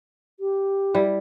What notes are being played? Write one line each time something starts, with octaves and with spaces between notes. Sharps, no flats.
G4
G3 E4